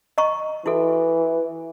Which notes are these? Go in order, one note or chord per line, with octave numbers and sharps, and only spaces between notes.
D#5 A#5 C#6
E3 E4 F#4 A4